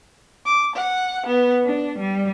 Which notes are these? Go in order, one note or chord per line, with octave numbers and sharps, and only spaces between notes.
D6
F#5
B3
D4
G3